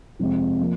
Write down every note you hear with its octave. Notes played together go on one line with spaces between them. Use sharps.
F2 C3 F3 G#3 C4
F3 A#3